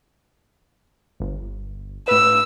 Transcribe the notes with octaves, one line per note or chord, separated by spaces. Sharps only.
G1
A2 B4 E6